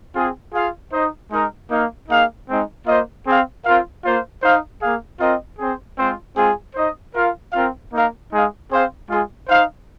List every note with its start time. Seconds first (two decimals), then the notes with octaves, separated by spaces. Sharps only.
0.15 C4 F4 G#4
0.53 F4 G#4 F5
0.92 D#4 C5 D#5
1.31 G#3 D#4 A#4 D#5
1.70 A#3 D#4 A#4 F5
2.09 A#3 D#4 G#4 F5
2.48 G#3 C4 D#4
2.86 A#3 F4 C5 D#5
3.26 C4 G#4 F5
3.64 C4 F4 A#4 F5
4.04 A#3 F4 C5 F5
4.42 D#4 C5 F5
4.81 A#3 G#4 F5
5.19 C4 F4 A#4 D#5
5.59 C4 G#4 C5
5.97 G#3 C4 F4 C5
6.37 G#3 C4 F4 G#4
6.75 D#4 C5 D#5
7.14 F4 A#4 F5
7.53 C4 F4 A#4 F5
7.91 A#3 D#4 A#4 F5
8.31 G#3 D#4 G#4 F5
8.70 C4 G#4 C5 F5
9.09 G#3 F4 G#4
9.48 D#4 C5 F5